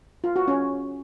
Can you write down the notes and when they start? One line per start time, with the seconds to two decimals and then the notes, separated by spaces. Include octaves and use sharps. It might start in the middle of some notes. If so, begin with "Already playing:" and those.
0.24 F4
0.36 F#4
0.48 C#4